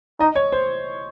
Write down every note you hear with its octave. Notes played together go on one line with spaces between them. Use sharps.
D#4 D#5
C#5
C5